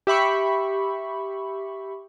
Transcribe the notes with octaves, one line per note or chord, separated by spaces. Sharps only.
G4 E5 B5 C#6